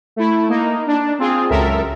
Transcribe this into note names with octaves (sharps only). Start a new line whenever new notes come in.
A3 E4
A#3 D#4
D4
C4 F4 G#4
C#2 F#2 A4 A#4 E5